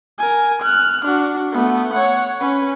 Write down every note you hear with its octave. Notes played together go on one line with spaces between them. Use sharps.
A#4 G#5
F6 F#6
D4 F#4
A3 B3
C#5 F#5
C#4 B4